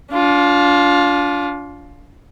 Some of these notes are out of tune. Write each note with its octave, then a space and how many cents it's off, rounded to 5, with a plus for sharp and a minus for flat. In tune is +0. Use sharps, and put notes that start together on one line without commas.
D4 -35 F4 +15